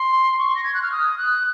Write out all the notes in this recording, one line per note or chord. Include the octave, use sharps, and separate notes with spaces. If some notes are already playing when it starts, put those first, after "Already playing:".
Already playing: C6
C#6
A#6
G#6
F#6
F6
D#6
F#6